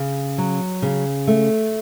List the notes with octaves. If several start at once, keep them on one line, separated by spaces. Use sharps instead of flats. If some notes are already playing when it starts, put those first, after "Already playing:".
Already playing: C#3
F#3
C#3
A3